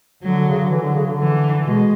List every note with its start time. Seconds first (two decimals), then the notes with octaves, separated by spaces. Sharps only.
0.23 D3 F#3
0.48 C#3
0.59 D3
0.70 E3 F#3
0.82 D3
0.94 C#3
1.06 D3
1.18 E3
1.65 B2 G#3